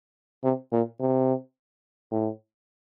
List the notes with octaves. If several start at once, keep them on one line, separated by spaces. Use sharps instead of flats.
C3
A#2
C3
A2